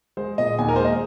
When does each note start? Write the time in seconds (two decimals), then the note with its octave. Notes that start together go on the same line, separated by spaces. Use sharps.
0.17 G#3 C5
0.38 A#2 D#5
0.59 D#2 G#5
0.69 A#4
0.76 C5
0.79 G#3
0.85 D#5